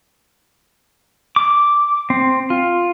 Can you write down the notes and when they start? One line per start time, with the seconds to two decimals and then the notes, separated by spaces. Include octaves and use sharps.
1.36 D6
2.10 C4
2.50 F4